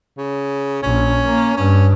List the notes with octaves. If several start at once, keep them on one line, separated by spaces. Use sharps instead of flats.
C#3
A#1 C#4
A#3
G2 C#4